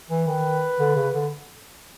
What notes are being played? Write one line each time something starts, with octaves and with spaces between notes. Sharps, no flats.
E3
D#3 B4
D3
C#3
D3